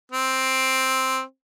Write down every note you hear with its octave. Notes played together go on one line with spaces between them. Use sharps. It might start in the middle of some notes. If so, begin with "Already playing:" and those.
C4